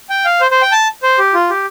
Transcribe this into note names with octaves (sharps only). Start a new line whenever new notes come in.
G5
F5
C5
C5
G5
A5
C5
G4
F4
G4